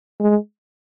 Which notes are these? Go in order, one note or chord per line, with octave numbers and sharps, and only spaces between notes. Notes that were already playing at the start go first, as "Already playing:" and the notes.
G#3